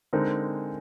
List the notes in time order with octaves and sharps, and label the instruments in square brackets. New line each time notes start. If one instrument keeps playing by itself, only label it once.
[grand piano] D3 G#3 C4 D#4 A#4